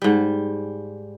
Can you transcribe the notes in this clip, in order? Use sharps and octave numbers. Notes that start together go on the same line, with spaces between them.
G#2 G3